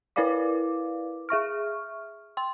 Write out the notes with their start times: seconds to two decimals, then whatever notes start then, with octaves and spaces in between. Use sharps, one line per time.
0.16 E4 A#4 B4 D5 F5 D6
1.29 G#4 E5 C#6 F6
2.37 G5 C6